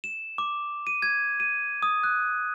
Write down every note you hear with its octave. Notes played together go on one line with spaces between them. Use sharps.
E7
D6
D#7
G#6
D#7
D#6
F#6